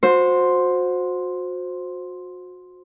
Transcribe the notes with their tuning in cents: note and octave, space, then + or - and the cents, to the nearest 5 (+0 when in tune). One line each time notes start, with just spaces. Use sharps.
F#4 -30 C5 +0